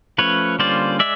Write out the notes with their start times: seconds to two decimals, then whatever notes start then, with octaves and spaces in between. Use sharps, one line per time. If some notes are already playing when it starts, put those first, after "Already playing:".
0.18 F3 A3 C#4 B4 C#5
0.59 D3 G3 A#3 C#4 F4 C5 D5
0.99 G#3 D5 E5